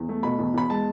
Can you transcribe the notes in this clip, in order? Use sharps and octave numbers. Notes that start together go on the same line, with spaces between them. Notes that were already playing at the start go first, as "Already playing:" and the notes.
Already playing: E2
A3
B2 B5
E2
E2 B5
G#3 A5